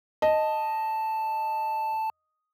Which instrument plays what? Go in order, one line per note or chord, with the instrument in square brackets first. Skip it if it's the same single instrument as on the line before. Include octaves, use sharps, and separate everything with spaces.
[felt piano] D#5 [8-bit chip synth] A5